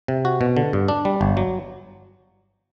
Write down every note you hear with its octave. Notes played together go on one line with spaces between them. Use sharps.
C3
F#4
B2
D3
G2
D4
G3
G1
F#3